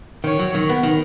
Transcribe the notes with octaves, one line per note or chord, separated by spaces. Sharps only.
D#3 C#5
F#3
D#3
B3
D#3